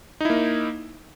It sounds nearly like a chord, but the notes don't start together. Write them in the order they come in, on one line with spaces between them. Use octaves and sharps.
D#4 E4 A#3